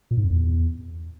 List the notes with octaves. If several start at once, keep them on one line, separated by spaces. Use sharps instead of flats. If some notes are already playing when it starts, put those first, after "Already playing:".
A#2
G#2
F2
E2